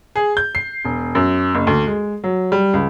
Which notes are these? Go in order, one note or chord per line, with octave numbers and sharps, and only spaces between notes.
G#4
G6
C7
E1
F#2
F#1
D2
G#3
F#3
G3
C#2